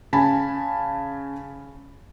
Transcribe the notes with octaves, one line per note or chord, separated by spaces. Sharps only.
C#3 G#5 A5 B5